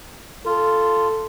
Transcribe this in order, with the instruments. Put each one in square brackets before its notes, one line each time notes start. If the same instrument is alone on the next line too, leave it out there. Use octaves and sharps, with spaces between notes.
[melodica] F4 [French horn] A4